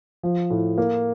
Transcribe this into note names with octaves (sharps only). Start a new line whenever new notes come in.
F3
A2
A#3